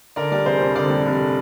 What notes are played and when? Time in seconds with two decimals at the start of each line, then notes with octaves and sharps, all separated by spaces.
0.16 D3 A#4 D5
0.32 G3 A#4 D5
0.46 F1 G#4 C5
0.60 F2
0.76 D3 A#4 D5
0.90 G3
1.05 F1